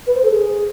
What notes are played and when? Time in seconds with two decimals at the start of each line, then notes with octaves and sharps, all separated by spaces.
0.07 B4
0.15 C5
0.23 A4
0.31 G#4